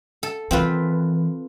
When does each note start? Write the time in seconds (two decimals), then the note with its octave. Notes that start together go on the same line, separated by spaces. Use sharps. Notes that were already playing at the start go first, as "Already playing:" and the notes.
0.23 A4
0.51 D#3 E3 C4 F4 B4